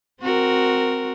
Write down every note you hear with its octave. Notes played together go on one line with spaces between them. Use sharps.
C4 F#4 A#4